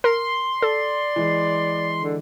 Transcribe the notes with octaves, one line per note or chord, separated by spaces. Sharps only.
A#4 C6
A4 D5
E3 G#3
D3